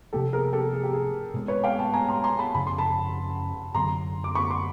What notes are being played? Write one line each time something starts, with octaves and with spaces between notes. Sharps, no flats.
C3 F3 A#3 C#4 G4 A4
G#4 A#4
G4 A4
G#4
G4
G#4
B2 G#3 C4
B4 C#5
F5 G5
G5 A5
G#5 A#5
A#5 C6
A#5 C6
A5 B5
F#2 C#3 F3 B5
C6
A5 B5
F#2 D3 F#3 A#5 C6
D6
B5 C#6
C6 D6